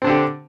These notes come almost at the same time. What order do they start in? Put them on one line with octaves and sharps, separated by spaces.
C4 D4 D3 G4